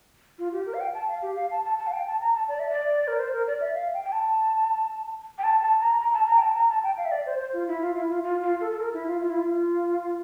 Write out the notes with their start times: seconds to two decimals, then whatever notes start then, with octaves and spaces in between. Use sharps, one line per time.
0.39 F4
0.52 G4
0.66 A#4
0.74 F5
0.80 G5
0.94 A5
1.08 F5
1.22 G4
1.36 F5
1.51 A5
1.65 A5
1.79 A5
1.87 F5
1.93 G5
2.07 A5
2.20 A#5
2.35 A5
2.48 D5
2.59 E5
2.70 D5
3.08 A#4
3.19 C5
3.33 A#4
3.47 D5
3.61 E5
3.74 F5
3.94 G5
4.04 G5
4.12 A5
5.38 G5
5.44 A5
5.62 A5
5.81 A#5
5.99 A#5
6.13 A5
6.27 A#5
6.37 G5
6.42 A5
6.55 A#5
6.69 A5
6.83 G5
6.97 F5
7.05 E5
7.11 D5
7.26 C5
7.39 C5
7.53 F4
7.68 E4
7.82 F4
7.96 E4
8.10 F4
8.23 F4
8.43 F4
8.61 A4
8.71 A4
8.80 A#4
8.93 E4
9.07 F4
9.22 F4
9.30 E4
9.37 F4